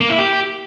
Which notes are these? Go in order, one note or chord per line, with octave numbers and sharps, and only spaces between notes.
A#3
E4
G4